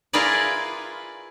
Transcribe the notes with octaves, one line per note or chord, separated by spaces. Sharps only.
E4 F4 G#4 A#4 B4 D5